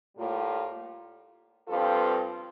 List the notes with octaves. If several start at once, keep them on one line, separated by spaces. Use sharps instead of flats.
A2 G3 A#3 F4
G2 F3 C4 F4 A4